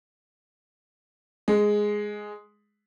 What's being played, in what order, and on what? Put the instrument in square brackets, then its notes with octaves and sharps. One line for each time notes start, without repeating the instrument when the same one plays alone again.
[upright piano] G#3